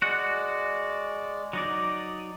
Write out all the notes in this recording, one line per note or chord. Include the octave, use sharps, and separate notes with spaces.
G#3 F#4 D5 F#5
F#3 D#4 D5 D#6